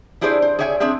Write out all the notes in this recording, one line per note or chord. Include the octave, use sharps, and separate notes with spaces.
D4 E4 G4 G#4 C5 D5
C5
G#4 C#5 D5 E5 F#5 G#5
C4 D4 G#4 E5